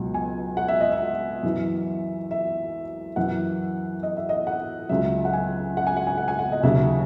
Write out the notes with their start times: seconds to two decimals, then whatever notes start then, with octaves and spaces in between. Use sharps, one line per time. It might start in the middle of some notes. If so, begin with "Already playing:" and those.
Already playing: C#2 B2 F#3
0.14 G#5
0.57 F#5
0.68 E5
0.80 D#5
0.92 E5
1.43 F#2 E3
2.31 E5
3.16 F#2 E3 F#5
4.03 D#5
4.17 E5
4.29 D#5
4.47 F#5
4.89 C#2 C#3 F#3 E5
5.25 F#5
5.33 G#5
5.77 F#5
5.87 G#5
5.97 F#5
6.07 G#5
6.18 F#5
6.28 G#5
6.39 F#5
6.52 D#5
6.63 D#2 C#3 F#3 E5